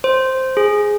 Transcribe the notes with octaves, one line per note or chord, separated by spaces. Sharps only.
C5
G#4